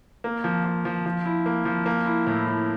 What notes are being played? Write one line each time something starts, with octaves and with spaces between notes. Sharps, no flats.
A#3
F3
F3
F3
F3
E4
A#3
F3
A#3
E4
A2
A2